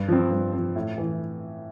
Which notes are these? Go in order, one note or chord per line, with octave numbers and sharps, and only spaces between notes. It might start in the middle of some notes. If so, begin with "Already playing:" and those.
Already playing: G2
F3 C4
G2
F3 C4
A2
E3